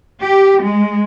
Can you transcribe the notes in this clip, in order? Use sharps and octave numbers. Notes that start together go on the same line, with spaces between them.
G4
G#3